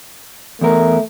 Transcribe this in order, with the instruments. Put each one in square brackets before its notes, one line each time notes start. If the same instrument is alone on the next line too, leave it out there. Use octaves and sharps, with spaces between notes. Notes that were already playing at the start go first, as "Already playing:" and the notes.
[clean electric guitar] E2 A#4 [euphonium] A3